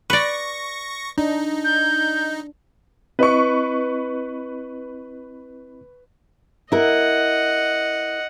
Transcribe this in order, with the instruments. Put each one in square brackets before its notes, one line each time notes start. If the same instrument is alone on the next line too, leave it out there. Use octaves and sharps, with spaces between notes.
[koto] B4 D5 [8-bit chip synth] C#6 A#6
[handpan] D4 [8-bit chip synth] D#4
[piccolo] G6
[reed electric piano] C4 E4 D#5 [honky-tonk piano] B4 C#6
[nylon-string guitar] E4 A#4 [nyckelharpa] D#5 F#5